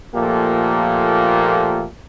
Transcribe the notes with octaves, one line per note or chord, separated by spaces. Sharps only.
A#2 F3 A3 A#3 G4 A4